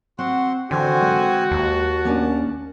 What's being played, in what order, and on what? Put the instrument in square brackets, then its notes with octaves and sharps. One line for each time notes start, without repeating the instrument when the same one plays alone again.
[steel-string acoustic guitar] C4 [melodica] F#4 F#5 C6
[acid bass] D3 [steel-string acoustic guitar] E3 [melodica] C4 C5 G#5 [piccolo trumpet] F#4
[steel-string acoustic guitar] G#3 B4
[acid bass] D#2 [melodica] A5
[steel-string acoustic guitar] A#3 C#4 D4